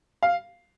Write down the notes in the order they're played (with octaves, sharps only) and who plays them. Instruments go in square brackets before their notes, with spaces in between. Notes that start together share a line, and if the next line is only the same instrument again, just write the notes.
[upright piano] F5